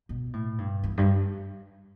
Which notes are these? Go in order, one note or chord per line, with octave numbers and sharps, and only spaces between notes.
B2
A2
G2
E2
G2